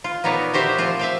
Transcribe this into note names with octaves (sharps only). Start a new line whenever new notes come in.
F4
A#2 B3 D#4 C#5 D5
F#4 G4 C5 E5
F3 C4 F4
E5 F5 G5